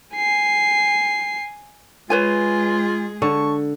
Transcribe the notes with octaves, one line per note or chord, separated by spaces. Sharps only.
G#5 C7
G#3 F4 G#4 B4 C#5 G#5
D3 A5 C#6